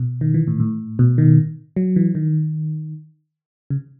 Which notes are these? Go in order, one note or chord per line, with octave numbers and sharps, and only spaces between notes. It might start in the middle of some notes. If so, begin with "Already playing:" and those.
Already playing: B2
D#3
E3
A2
A2
B2
D#3
F#3
E3
D#3
C#3